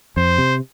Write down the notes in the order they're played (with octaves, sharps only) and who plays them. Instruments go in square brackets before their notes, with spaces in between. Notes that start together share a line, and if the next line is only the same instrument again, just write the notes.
[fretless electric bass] F2 [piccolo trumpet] C5
[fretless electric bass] C3